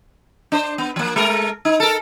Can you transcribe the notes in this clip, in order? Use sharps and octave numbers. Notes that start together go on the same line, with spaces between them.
D4 C5
B3
F3 A#3
G#3 A3 A#4
D#4
A4 A#4